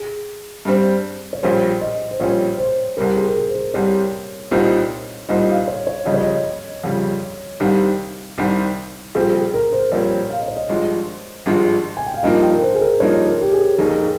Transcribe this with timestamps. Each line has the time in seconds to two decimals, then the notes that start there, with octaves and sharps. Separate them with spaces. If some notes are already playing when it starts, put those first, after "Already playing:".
Already playing: G#4
0.65 G2 G3 C4
1.33 C#5
1.43 A#1 A#2 G3 C#4 C5
1.81 D#5
2.11 C5
2.20 A#1 A#2 G3 C#4 C#5
2.58 C5
2.97 C2 C3 G3 A#4
3.17 G#4
3.28 A#4
3.36 G#4
3.49 C5
3.55 A#4
3.74 C2 C3 G3 C#5
4.51 C2 A#2 G3 C4 D#4
5.29 C2 A#2 G3 C4 D#4 D#5
5.48 F5
5.68 C#5
5.87 C#5
6.05 G1 F2 C#3 G3 D#5
6.14 C#5
6.21 D#5
6.84 G1 F2 C#3 G3
7.60 C2 C3 D#3 G3 F5
8.38 C2 C3 D#3 G3
9.15 A#1 A#2 G3 C4 G#4
9.35 G#4
9.54 A#4
9.72 C5
9.92 A#1 A#2 G3 C4 C#5
10.30 F5
10.39 D#5
10.48 C#5
10.57 D#5
10.69 G#1 G2 F3 G#3
11.46 G#1 G2 F3 G#3
11.97 G#5
12.06 G5
12.14 F5
12.23 G2 F3 A#3 D#4 D#5
12.42 G5
12.53 A#4
12.62 C5
12.75 G#4
12.81 A#4
13.00 G2 F3 A#3 D#4 C#5
13.26 A#4
13.41 G4
13.53 G#4
13.78 F1 D#2 D#3 A#3 D#4 G#4
13.90 A#4
14.02 G#4